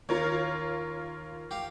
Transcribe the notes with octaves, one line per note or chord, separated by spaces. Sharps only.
D#2 F4 A#4 C#5
G4 F5